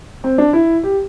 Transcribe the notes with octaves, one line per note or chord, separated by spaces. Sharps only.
C4
D4
E4
G4